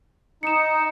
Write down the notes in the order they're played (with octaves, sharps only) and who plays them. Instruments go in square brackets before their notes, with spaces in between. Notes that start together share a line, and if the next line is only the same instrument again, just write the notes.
[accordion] D#4 [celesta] C#7 E7